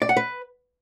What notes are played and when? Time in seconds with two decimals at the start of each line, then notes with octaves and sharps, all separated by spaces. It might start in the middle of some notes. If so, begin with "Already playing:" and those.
0.02 D5
0.09 F#5
0.17 B4